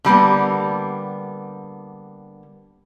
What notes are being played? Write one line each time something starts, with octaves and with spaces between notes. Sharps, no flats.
D3 G3 A#3 B3